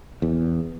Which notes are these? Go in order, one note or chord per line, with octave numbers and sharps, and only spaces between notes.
E2